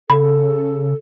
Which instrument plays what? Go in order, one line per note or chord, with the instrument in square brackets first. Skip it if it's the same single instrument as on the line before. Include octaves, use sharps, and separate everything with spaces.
[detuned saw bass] C#3 [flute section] A4 [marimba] B5